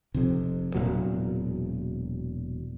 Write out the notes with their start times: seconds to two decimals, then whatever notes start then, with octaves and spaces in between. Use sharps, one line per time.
0.14 F1 F2 C3
0.74 E1 A#2 F#3